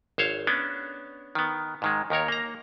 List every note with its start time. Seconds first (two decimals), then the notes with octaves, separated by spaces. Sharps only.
0.18 G#1 C5 C#5 F5
0.47 B3 C#4 D4
1.35 D#3 B3
1.82 G#2 D#3 G#3
2.10 D#2 D#3 A#4 C#5
2.28 A#3 A#5